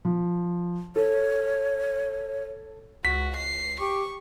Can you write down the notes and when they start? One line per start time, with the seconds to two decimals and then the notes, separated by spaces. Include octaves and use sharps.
0.05 F3
0.96 A4 C#5
3.05 C#2 F#4 B6
3.36 C7
3.80 G4 C#6